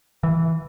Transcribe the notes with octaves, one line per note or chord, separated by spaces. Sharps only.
E3